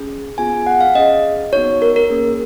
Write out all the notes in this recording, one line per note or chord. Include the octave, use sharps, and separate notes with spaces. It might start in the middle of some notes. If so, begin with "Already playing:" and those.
Already playing: C#4 G#4
B3 F4 G#4 G#5
F#5
F5
C#4 G#4 D#5
B3 D#4 F#4 C#5
A#4
A#4
A#3 C#4 G#4